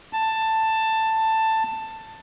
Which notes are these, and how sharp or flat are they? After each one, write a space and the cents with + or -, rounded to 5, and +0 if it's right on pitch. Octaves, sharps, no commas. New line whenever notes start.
A5 +10